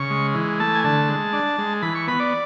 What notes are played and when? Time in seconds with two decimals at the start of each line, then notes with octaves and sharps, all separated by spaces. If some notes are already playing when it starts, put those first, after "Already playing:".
Already playing: C#3 C#6
0.10 G#3
0.34 E3
0.60 A3 A5
0.75 G#5
0.84 D3 A5
1.08 G#3
1.33 D4
1.58 G#3
1.82 E3 B5
1.95 C#6
2.07 B3 B5
2.20 D5